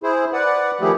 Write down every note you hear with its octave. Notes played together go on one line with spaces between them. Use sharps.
E4 G#4 C5
B4 D5 F#5
D#3 F3 A3 E4 G4 G#4